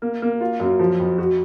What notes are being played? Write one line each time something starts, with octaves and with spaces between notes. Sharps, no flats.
A#3
A#3
F4
F#2
F3
F2
F#4